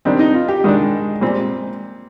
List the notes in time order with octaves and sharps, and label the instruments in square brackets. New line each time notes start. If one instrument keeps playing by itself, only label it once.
[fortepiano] D#3 G3 D4 [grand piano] C4
[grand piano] D#4
F4
G4
[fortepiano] D#3 G3 D4 [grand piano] G#3
[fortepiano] A#2 G3 C4